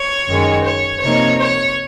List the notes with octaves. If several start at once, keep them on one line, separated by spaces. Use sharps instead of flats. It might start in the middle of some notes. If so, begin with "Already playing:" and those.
Already playing: C#5
F#2 D#3 G#3
C#5
C3 F3 A#3 D#4 C#5
C#5